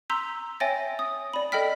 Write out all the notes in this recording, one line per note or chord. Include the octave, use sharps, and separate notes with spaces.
A#5 C6 E6 G6 B6
C#5 E5 G5 G#5 A6 A#6
D#6
D5 B5
A4 D#5 G5 F6 B6